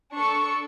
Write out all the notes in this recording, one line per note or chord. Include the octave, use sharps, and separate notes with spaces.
D4 A4 C#6